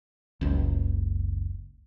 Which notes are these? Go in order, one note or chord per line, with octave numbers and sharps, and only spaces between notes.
F#1 C#2